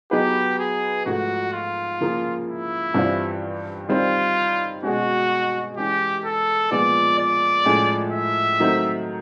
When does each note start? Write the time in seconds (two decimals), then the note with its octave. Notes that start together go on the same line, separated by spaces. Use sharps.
0.11 F#3 B3 D#4 G4 G#4 B4
0.59 G#4
1.06 G#2 F3 A3 F#4
1.53 F4
2.01 C#3 F3 A#3
2.48 E4
2.94 G2 E3 G3 C4 F4
3.89 D#3 G3 C4 F4
4.83 B2 G#3 C#4 F#4
5.77 E3 G#3 C#4 G4
6.24 A4
6.71 A#2 F3 G#3 B3 D5
7.19 D5
7.66 A2 F3 G#3 C#4
8.13 E5
8.60 D#3 F#3 A3 C4